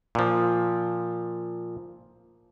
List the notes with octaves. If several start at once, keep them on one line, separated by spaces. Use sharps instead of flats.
A#2 F3